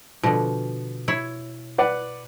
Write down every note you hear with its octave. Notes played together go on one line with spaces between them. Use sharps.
B2 D3 F3
E4 C#5
B4 D5 F#5